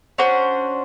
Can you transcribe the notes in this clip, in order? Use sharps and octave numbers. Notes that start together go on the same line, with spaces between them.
C#4 D4 F#4 C5